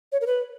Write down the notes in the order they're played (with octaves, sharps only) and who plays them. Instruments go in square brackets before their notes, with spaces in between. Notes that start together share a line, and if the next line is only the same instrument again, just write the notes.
[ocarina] C#5
A#4
B4